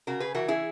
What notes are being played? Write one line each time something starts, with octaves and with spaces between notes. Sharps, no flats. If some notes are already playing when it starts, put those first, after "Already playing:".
C#3 F#4 A#4
G#4 B4
E3 F#4 A#4
E4 G#4